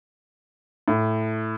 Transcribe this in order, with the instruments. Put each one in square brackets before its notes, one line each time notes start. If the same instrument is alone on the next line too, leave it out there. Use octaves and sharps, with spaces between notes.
[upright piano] A2